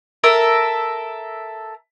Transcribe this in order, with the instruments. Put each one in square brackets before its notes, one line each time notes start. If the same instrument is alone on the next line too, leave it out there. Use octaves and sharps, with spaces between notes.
[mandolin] A4 A#4 E5